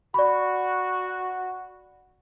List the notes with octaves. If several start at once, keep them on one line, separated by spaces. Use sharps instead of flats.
F#4 D5 B5